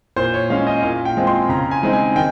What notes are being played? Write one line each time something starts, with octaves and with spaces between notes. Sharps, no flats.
A#2 C5
C#5
G#3 C#4 F5
D#5
A#2 F5
G5
G#3 C4 F4
C6
C#3 A#5
G#5
G#3 C4 D#4
G#5
D#3 G5